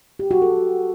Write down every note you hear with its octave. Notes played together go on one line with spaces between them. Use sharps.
G4
F#4
A4